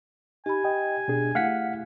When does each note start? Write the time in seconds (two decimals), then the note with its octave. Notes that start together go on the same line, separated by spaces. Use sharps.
0.46 D#4 G4 G#5 B5
0.64 D#5 G5
1.08 B2 D4 G#4
1.35 A3 E4 F5 F#5 B6